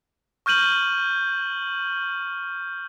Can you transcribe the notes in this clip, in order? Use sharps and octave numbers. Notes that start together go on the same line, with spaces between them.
C#6 F6 G6 D#7 F#7